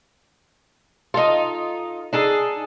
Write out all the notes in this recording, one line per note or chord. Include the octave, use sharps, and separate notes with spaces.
D#4 F4 A4 D#5
D4 D#4 G#4 A4